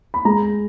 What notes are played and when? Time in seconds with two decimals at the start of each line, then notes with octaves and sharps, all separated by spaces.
0.14 B5
0.25 G#3 A#5